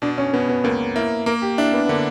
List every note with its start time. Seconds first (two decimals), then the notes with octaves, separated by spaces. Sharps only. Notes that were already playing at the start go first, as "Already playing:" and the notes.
0.02 B2 D4
0.18 C#4
0.33 B2 B3
0.49 B3
0.64 C#2 A#3
0.96 A#3 E4
1.26 A#3 A#4
1.42 G4
1.58 D4 E4
1.73 B3
1.85 B3
1.89 D3 A#3